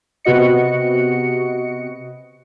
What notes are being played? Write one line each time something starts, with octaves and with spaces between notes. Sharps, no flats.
C3 B3 F#4 D#5 C#7